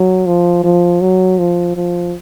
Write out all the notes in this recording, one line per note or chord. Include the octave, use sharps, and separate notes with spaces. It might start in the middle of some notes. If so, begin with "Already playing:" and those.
Already playing: F#3
F3
F3
F#3
F3
F3